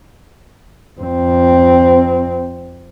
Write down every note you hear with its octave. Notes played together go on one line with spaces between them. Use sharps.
F2 C4